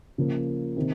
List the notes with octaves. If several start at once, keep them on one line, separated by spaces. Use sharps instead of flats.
C#3 F3 A#3
C3 D#3